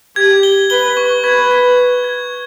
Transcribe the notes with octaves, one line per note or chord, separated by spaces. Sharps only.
G4 G#6
G7
B4 G7
C#6
B4 G#6
G#6
G#6
G#6